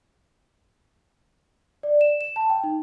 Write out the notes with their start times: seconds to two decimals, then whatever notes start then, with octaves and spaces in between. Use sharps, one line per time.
1.83 D5
2.01 E7
2.21 E7
2.36 A5
2.50 G5
2.64 D#4